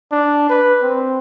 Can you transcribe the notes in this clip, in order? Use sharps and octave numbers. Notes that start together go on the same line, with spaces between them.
D4
B4
C4